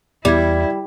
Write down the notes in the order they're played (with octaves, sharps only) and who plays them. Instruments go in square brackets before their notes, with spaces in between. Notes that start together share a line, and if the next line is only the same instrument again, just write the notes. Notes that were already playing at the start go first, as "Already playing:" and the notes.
[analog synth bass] E2 [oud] G3 [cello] E4 [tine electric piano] D5 E5 G#6